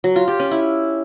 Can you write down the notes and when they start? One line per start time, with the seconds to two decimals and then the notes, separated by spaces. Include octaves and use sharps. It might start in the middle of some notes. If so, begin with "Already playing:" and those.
0.04 F#3
0.16 F4
0.28 G4
0.39 C#4
0.51 E4